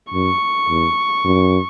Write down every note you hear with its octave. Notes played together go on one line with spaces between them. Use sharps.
F#2 C#6
E2
F#2